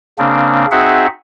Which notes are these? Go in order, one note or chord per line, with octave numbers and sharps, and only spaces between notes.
C#3 A#3 C4 D4
C4 D#4 F#4 G#4 E5 F#5